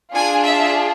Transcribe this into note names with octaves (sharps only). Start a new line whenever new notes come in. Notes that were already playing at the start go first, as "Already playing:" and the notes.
D4 F4 G#4 G#5
E5